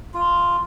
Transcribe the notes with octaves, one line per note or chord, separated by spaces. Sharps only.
F4